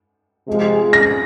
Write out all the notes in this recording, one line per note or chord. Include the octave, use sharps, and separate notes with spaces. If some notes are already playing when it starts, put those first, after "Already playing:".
C3 F3 G#3
A#6